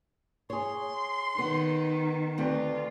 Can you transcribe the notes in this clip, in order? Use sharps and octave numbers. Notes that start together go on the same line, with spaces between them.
G#4 C#5 C6
D#3 B3 F#5
D2 C4 F4 B4